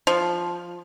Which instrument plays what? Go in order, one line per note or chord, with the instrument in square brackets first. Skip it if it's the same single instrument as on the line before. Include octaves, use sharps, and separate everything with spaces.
[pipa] F3